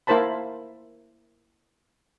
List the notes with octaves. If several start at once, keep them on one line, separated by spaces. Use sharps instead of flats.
A#3 E4 A#4 C5 A5 B5